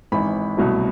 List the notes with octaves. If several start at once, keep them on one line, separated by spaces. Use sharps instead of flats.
G#1 G#2 E3 B5
C2 B2 F#3 A3